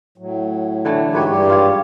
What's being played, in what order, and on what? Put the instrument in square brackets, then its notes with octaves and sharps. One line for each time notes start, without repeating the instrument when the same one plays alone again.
[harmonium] A2 F#3
[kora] D3 E3 A3
[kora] G#2 B4 C#5 [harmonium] F#4 G4
[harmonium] G2 G3 G4
[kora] F4 C#5